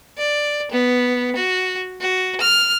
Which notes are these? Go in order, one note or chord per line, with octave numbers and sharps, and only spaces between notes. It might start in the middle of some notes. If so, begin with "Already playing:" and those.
D5
B3
F#4
F#4
F6